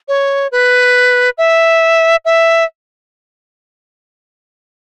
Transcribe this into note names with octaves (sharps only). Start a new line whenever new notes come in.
C#5
B4
E5
E5